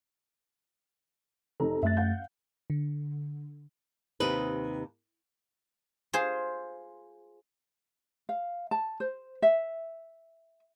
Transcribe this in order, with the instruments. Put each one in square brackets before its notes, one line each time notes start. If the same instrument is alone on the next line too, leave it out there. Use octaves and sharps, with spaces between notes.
[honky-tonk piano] F1 D#4 A#5 [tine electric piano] A4
[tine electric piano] F#2 A3 A6 [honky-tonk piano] E5 F#6
[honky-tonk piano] F5 F#5 G6
[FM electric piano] D3
[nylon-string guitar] D#2 C3 D#4 B4
[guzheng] F4 G#4 C5
[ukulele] F5
A5
C5
E5